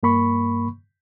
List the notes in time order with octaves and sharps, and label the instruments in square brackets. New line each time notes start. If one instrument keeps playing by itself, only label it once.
[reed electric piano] G2 A#3 B5 C#6